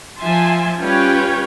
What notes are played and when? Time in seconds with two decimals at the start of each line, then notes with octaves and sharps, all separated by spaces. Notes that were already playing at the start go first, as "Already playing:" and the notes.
0.19 F3 E5 G#5 A5 C6
0.79 G3 C#4 F4 B4 C#5 G5